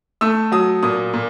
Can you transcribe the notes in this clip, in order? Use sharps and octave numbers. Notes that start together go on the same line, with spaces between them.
A3 E6
F#3 D#6
A#2 D#6
A#2